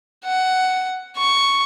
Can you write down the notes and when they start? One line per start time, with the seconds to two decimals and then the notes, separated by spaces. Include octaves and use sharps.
0.24 F#5
1.17 C#6